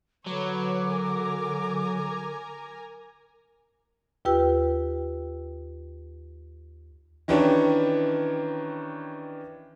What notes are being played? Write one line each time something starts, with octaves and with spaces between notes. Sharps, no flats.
D3 F#3 B4 C#5 D6
A#4 G#5 A#5
D#2 F4 G4 B4 G5 E6
D#3 E3 C#4 D4 G4 C#5